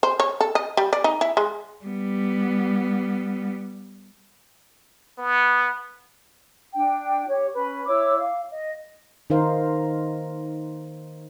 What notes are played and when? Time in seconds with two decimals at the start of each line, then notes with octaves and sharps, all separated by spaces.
0.03 C5
0.20 C#5
0.41 A4
0.55 D#5
0.77 G3
0.93 D5
1.04 D#4
1.21 E4
1.37 G#3
1.85 G3 B3
5.18 B3
6.73 D4 G5
7.28 G4 C#5
7.54 C#4 B4
7.87 E4 C#5 D6 E6
8.18 F5
8.50 D#5
9.30 D#3 D#4 A#4 C5 F5